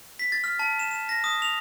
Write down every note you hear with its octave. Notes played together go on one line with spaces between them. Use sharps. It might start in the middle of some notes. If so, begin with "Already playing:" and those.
B6
A6
F6
A5
E7
E7
A#6
D#6
F7